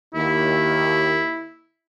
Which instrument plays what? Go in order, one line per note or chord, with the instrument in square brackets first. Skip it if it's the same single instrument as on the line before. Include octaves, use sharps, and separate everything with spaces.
[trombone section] D#2 [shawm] E4